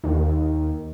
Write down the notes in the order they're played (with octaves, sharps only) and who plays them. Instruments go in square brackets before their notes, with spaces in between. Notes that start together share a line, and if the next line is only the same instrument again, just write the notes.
[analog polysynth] D#2